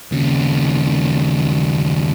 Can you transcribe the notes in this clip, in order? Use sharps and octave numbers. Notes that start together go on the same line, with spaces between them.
D#2 C#3